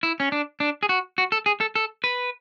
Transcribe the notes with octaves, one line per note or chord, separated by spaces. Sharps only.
E4
C#4
D4
D4
G#4
F#4
F#4
A4
G#4
A4
A4
B4